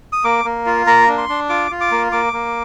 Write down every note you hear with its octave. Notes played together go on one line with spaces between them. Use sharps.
D#6
A#3 D6
A#3
F4
A#3 A#5
D4
C6
D4
F4 D6
F4
D6
A#3
A#3 D6
A#3